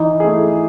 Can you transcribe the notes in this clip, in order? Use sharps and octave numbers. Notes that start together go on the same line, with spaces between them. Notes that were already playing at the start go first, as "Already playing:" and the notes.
Already playing: E3 D#4
A3 E4 G#4